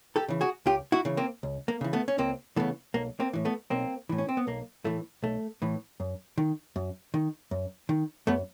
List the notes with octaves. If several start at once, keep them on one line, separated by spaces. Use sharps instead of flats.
G4 A4
C#3 E3
F#4 G#4
C#2 F4 G4
E4 F#4
C#3 E3
A#3 C4
C#2
A#3
C#3 E3
A3 B3
C#4
C#2 A#3 C4
C#3 E3 A3 B3
B1 A#3
A#3 C4
A2 E3
A3 B3
B1 A#3 C4
A2 E3
C#4
C4
B3
B1 A#3
A2 E3 A3
B1 A3
A2 E3
F#2
D#3
F#2
D#3
F#2
D#3
F#2 A3 B3